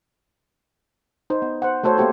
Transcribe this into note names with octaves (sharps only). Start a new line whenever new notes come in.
D#4 C5
B3
C5 F#5
A3 F#4 A4 C5 C#5
A#3 B3 G4 C5